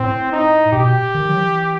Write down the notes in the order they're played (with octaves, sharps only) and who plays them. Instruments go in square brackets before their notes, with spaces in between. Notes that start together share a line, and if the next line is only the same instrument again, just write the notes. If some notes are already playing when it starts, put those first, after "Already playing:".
Already playing: [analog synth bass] A2 [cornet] C4
[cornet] D#4
[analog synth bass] B2 [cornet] G4
[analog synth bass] D#3
F#3
E3